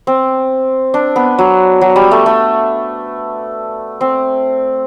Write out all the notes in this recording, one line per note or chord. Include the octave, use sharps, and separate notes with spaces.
C4
D4
B3
F#3
F#3
G3
A3
A3
C4